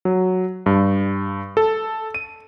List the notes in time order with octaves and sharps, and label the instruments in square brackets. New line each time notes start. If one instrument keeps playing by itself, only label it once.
[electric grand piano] F#3
G2
A4
D#7